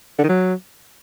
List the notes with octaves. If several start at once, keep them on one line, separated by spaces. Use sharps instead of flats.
D3
D#3
F#3